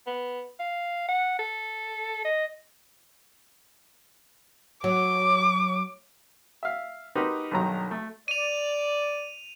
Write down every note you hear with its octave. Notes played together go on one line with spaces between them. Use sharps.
B3
F5
F#5
A4
D#5
F#3 D6
E5 F5
D#4 F#4 G4 A#4 B4 C6
B1 G2 D#3 F#3 A#5
A3
D5 D#7 F7